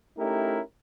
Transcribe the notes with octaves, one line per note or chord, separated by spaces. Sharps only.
A3 C#4 D#4 E4 G4 A#4